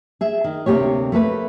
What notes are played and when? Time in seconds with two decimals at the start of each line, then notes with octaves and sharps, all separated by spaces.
0.21 G#4 E5
0.44 D#3
0.66 D2 C3 E3 A#3 G4 C#5
1.12 A3 A#3 A4 B4